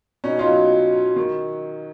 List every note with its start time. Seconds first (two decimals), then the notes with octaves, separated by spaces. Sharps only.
0.24 B2 C#4 D#4
0.39 D#4 F4
0.47 F#3
0.70 F#3
0.93 F#3
1.16 D#3